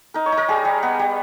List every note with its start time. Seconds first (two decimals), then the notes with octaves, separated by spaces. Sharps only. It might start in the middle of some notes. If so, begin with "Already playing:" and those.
0.14 D#4 A#4
0.26 C#5
0.32 D#4
0.37 A#4
0.48 G3 G#4
0.65 G3
0.83 B3
0.99 G3